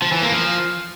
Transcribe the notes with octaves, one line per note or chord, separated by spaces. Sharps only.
F3
E3
A#3
F3